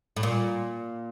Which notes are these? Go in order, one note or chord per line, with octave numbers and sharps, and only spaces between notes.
A2
A#2